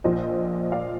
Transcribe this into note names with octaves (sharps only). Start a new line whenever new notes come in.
A#1 A#2 F3 C5 D#5
D5 F5